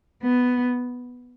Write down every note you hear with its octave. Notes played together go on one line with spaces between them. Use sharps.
B3